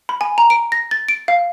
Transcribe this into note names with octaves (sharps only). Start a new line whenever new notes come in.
B5
G#5
A#5
D7
A#6
A6
D7
F5